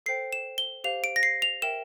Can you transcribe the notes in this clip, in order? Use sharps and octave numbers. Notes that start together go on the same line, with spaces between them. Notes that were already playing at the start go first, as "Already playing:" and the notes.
A4 C5 G5 C7
E7
G7
G4 C5 F5 F7
D7
A#6
C7
F7
A#4 E5 G5 E7